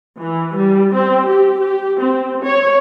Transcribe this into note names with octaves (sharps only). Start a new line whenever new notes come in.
E3
G3
C4
G4
G4
C4
C#5